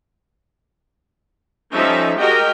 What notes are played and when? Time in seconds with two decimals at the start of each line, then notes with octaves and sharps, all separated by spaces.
1.73 F3 G3 C#4 D#4 A4 E5
2.18 G#3 F#4 G4 A#4 D#5 G5